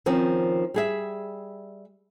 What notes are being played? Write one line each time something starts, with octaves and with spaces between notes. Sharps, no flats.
D#3 F3 C4 C#4
G3 G#4 E5